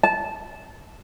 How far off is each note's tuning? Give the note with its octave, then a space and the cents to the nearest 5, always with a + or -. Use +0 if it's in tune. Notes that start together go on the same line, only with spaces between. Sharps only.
A5 -15